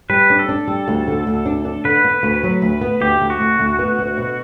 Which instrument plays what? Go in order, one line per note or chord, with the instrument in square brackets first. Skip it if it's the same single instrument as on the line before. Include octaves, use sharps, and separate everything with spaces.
[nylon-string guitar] G3 [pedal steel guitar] B4
[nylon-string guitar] D4
[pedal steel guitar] A4
[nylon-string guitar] D4
G3
D2
D3
D2
D4
D4
[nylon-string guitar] D3 [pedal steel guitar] B4
[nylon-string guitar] B3
D2
F#3
D2
B3
[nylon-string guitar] D2 [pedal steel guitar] G4
[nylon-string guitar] D2
[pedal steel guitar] F#4
[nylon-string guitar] D2
D2
B3
D2
B2